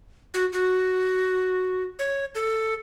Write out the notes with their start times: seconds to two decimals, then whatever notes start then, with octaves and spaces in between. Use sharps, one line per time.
0.34 F#4
0.53 F#4
1.99 C#5
2.35 A4